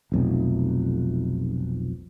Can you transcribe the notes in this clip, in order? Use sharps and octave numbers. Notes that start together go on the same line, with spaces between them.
F1 B1 F2